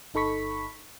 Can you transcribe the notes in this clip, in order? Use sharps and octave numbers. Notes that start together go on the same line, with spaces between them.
G1 D#4 A4 B5 C#6 B6